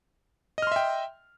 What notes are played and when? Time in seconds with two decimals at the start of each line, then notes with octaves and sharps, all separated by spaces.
0.58 D#5
0.62 F6
0.67 C6
0.72 E5
0.76 G5